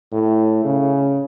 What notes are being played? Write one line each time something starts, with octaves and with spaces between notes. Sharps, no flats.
A2
C#3